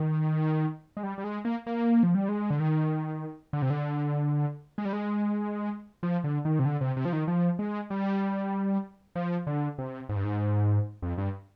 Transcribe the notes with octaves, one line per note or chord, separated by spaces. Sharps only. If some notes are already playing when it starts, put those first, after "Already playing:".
Already playing: D#3
G#3
G3
G3
G#3
A#3
A#3
F3
G3
G#3
D3
D#3
D3
C3
D3
G#3
G3
G#3
F3
D3
D#3
C3
D3
C3
C3
F3
D#3
F3
G#3
G3
F3
D3
C3
G#2
G2
G#2
F2
G2